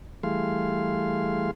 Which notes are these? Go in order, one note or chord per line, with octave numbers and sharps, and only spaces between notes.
E3 G3 A3 G#4 F5 C6